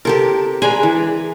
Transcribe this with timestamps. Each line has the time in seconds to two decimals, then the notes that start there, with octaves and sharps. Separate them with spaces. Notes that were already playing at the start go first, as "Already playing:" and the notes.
0.05 C3 G4 A4 A#4
0.62 G#3 D4 G#5 A#5 B5
0.83 E3